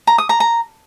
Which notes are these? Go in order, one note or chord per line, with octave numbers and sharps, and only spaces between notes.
A#5
D#6
A#5
A#5